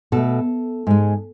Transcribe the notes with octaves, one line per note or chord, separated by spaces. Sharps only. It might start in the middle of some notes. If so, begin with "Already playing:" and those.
B2 A3 A4
G#2 G#3